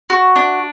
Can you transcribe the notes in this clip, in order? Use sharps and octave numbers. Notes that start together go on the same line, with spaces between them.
F#4
D4